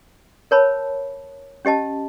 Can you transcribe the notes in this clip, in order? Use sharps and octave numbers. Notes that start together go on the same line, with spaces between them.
A#4 C5 C#5 A5 B5
C#4 G4 D#5 A5